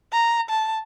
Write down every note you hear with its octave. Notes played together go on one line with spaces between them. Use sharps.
A#5
A5